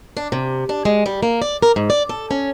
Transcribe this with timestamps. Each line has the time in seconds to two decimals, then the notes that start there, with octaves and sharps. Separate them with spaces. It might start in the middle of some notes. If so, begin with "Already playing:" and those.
0.17 D4
0.32 C3
0.69 D4
0.85 G#3
1.06 G3
1.23 A#3
1.42 D5
1.62 A#4
1.76 G#2
1.90 D5
2.09 A4
2.31 C#4